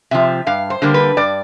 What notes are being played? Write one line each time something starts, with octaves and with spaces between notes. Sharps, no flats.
C3 F3 E5
G2 F5
C5
D3 G3 A#3
B4
G2 D5